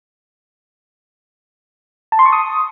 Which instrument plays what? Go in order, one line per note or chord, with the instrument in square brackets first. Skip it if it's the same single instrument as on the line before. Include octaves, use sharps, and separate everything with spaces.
[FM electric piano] A5
C6
C#6
D#6